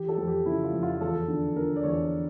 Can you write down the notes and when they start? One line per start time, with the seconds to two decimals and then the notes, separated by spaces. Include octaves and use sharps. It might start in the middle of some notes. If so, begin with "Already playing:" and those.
Already playing: E3 G4
0.08 A4
0.18 F2
0.27 G4
0.46 C#3 E4
0.64 F4
0.73 F2
0.83 F4
1.01 E2 A4
1.28 D3
1.56 D3 A#4
1.76 D5
1.84 E2 C#5